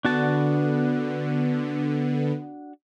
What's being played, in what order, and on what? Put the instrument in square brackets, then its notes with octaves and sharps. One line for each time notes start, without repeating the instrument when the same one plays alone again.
[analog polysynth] D3 B3 [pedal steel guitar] D4 F#4 A5